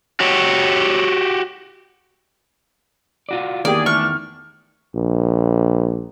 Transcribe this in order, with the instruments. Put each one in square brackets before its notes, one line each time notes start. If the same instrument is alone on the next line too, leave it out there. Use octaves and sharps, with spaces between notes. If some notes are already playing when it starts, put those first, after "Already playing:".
[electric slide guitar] F#4 G4 C#5
F4 F#4 D5
[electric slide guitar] E2 D#3 [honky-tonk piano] A#3 G4 [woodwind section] G#4 [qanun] D5
[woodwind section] E3 A3 D4 [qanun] C#6 [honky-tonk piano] F6
[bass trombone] A#1